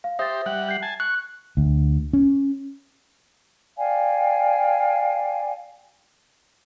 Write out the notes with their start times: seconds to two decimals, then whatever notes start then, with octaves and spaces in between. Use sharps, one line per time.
0.04 F5
0.19 G4 C5 E5 D#6 A6
0.46 G3 F#5 F#6
0.69 G6 C7
0.82 G#5 A5
1.00 C#6 F#6
1.57 D2
2.13 C#4
3.78 D5 F5 G5 G#5